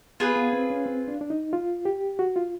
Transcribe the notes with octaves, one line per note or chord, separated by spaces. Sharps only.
B3 F4 G#4 B4
B3
C4
C#4
C4
D4
D4
D#4
F4
G4
F#4
F4